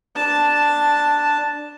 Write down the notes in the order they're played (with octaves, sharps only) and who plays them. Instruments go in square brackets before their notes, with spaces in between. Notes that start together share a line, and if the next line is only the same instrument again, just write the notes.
[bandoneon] D4 [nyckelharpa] A5